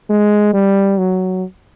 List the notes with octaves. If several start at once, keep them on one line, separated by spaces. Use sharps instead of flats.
G#3
G3
F#3